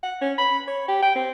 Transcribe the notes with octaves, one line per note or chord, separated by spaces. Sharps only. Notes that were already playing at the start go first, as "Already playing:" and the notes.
F#5
C#4
B5
C#5
G4
G5
C4